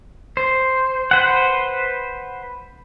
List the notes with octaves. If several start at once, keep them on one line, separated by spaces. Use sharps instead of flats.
C5
B4 C5 F#5